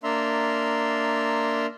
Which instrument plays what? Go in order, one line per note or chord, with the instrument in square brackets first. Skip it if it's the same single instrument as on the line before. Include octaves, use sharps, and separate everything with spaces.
[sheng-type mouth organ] A#3 D4 E5 A#5 C6